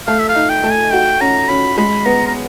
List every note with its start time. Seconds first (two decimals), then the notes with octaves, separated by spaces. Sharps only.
0.07 A3 F5
0.19 E5
0.29 F5
0.35 D#4
0.50 G5
0.64 A3
0.71 G#5
0.92 F#4 G5
1.21 C#4 A#5
1.49 C#4 B5
1.78 G#3 B5
2.06 B3 A#5
2.27 A#5